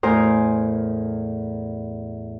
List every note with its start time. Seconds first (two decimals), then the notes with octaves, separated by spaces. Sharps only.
0.03 E2 A2 A#4 C5 G#5 D#6